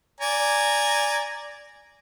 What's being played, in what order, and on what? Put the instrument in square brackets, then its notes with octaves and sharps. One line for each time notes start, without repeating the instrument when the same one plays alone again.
[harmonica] D5 G#5 A#5